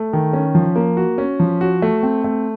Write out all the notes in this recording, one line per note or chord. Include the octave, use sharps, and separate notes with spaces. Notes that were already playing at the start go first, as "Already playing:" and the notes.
Already playing: A3
D#3
C#4
F3
A#3
F#4
C#4
F3
F#4
A3
C4
A3